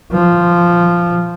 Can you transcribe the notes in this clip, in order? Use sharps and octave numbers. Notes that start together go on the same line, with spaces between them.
F3